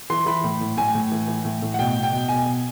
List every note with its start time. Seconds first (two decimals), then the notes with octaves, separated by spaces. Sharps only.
0.10 E3 C6
0.26 E3 B5
0.44 A2
0.61 A2
0.77 A2 G#5
0.95 A2
1.12 E3
1.28 E3
1.45 A2
1.62 A2
1.74 F#5
1.79 B2 G5
1.96 B2
2.03 G5
2.13 B2
2.29 B2 G#5
2.46 B2